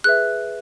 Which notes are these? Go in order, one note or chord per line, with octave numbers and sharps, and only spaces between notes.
G#4 B4 E5 F#6